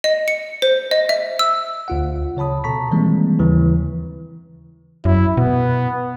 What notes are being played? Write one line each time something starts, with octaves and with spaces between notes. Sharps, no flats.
D#5
C#7
C5
D#5
E5
E6
D2 F4 F#5
C#3 C#5 A5 B5 D#6
B2 A4 A5 A#5 C#6 B6
D#3 E3 G3 G#3 A#3 C4
D#2 C#3 E3
F#2 E4
B2 B3